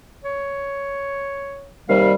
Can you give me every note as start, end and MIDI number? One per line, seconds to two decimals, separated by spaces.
0.24 1.70 73
1.89 2.15 39
1.89 2.15 48
1.89 2.15 55
1.89 2.12 77